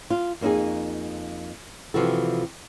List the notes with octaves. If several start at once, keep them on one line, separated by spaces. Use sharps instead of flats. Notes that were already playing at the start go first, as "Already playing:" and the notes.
F4
F2 A#3 D4 D#4 G#4
C3 E3 F3 G3 F#4 A4